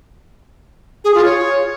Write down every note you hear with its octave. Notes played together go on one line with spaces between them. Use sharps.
G#4
F4
C#5